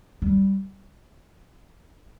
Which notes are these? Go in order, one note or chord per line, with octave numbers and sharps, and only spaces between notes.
G3